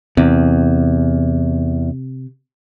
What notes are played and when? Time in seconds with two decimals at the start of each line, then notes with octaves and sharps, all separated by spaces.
0.17 E2 C3